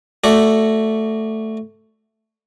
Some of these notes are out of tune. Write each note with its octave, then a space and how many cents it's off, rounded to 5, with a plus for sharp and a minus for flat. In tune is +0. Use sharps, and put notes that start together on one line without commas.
A3 +0 F#4 +0 D5 -5